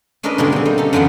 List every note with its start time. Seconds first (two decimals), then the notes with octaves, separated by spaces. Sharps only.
0.23 C#4 D4 E4 A#4 B4 D#5
0.38 B2 D3 G#3 A#3 C4
0.52 G3 C4
0.65 D#4
0.78 C#4 G4 A4
0.93 F#2 D3 E3 B3 F4 F#5